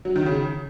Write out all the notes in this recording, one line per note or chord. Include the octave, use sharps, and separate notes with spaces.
F#3
D#3
C#3